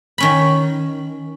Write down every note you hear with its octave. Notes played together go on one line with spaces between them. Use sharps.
D#3 C#4 B5